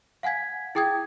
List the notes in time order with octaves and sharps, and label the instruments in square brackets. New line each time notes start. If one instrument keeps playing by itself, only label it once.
[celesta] F5 F#5 G#5 G#6 B6
E4 G#4 G5 D#6 G#6